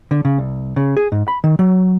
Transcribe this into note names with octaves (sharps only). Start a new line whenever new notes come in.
D3
C#3
C2
C#3
G#4
G#2
B5
D#3
F#3